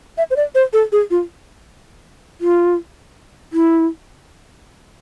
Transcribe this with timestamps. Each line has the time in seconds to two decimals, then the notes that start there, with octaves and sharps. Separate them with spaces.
0.18 E5
0.31 C5
0.36 D5
0.55 C5
0.73 A4
0.92 G#4
1.11 F4
2.41 F4
3.53 E4